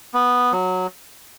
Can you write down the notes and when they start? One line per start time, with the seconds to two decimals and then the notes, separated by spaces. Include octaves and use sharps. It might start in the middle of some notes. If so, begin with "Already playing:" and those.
0.14 B3
0.52 F#3